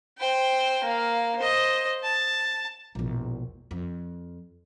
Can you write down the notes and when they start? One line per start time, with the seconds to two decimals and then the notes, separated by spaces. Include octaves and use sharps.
0.18 C5 G5
0.84 A#3 F5
1.38 C5 D#5
2.03 A5
2.95 E1 A#1
3.71 F2